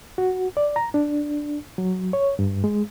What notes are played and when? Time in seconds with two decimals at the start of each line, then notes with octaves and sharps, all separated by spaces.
0.18 F#4
0.57 D5
0.76 A#5
0.94 D4
1.78 F#3
2.13 C#5
2.39 G2
2.64 G#3